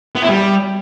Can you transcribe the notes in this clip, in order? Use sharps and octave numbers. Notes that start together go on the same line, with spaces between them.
B3
E4
G3